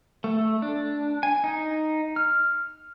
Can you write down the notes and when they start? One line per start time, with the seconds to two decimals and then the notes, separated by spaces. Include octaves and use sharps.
0.24 A3
0.62 D4
1.23 G#5
1.44 D#4
2.16 F6